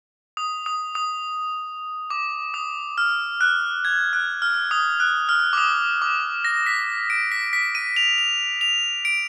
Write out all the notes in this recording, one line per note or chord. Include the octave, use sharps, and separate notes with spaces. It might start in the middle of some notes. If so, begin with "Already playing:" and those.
D#6
D#6
D#6
D6
D#6
F6
F#6
G#6
F#6
F6
D#6
F#6
F6
D6
D#6
D6
A#6
B6
D7
B6
B6
D#7
F7
F7
F7
D7